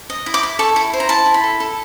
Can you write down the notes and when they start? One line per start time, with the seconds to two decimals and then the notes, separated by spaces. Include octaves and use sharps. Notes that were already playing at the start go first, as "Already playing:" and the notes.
0.10 D#5
0.26 E4
0.34 D6
0.43 E4
0.59 A4 C#6
0.76 E4
0.93 C5
1.00 A#5
1.09 E4 A5
1.26 E4
1.34 B5
1.44 A4
1.60 A4